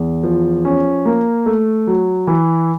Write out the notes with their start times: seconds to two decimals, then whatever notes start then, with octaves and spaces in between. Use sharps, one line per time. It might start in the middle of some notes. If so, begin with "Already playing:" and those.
Already playing: E2
0.23 F3
0.65 C#4
1.06 A#3
1.46 A3
1.87 F#3
2.27 E3